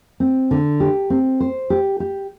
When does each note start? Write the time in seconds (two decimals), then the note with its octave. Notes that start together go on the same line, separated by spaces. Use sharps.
0.20 C4
0.51 D3
0.80 G4
1.10 C4
1.40 C5
1.70 G4
2.00 G4